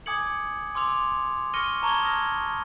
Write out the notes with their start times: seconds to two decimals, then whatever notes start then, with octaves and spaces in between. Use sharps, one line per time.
0.06 G#5 D6 D#6 G#6 C#7 F#7
0.75 G#5 C6 D6 E6 F7
1.54 C#6 F6 A#6 C#7 D#7 G7
1.82 A5 A#5 C#6 G#6 F7 G7
2.02 D#6 F6 G#6 A#6